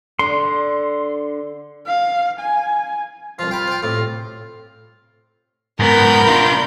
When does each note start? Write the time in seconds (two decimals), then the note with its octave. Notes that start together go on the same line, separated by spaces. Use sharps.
0.19 D3 C6
1.87 F5
2.40 G#5
3.39 C2 F3 F4
3.51 F4 G5 B5
3.67 C5 G5
3.83 A2 C3 F4
5.80 G#2 B3 A#4 B5 G6
6.28 D4 F4